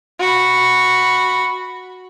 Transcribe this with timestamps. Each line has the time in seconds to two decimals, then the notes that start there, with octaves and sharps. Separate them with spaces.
0.20 F#4 B5